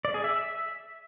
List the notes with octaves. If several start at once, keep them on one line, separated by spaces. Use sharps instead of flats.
D5
G#4
E5